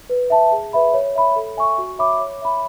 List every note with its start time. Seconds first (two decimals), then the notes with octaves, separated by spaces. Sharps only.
0.10 B4
0.30 E5 A5
0.52 G#4
0.73 B4 E5 B5
0.94 C#5
1.15 E5 B5
1.36 A4
1.57 E5 G#5 C#6
1.78 F#4
1.99 C#5 E5 B5 D6
2.20 C#5
2.42 E5 B5